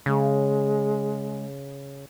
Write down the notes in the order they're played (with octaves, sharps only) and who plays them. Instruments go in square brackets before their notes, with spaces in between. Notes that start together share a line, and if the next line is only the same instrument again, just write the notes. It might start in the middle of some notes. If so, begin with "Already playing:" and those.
[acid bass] C#3 [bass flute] G#3